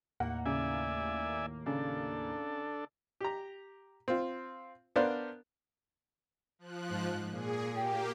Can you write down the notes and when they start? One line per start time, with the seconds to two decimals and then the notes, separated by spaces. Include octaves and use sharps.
0.20 D#2 A2 A#3 F#5
0.46 C#3 D5 E5 G#5
1.66 C#3 D4 A4
3.21 G4 A#5
4.08 C4 F4
4.96 B3 D4 A#4 C5 D5 F5
6.59 F3 F#6
6.90 G#2
7.31 A#2 G#4
7.76 A#3 G4 G5